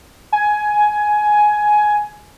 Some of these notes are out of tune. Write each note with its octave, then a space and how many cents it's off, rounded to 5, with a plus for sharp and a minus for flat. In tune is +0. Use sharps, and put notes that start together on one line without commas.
G#5 +15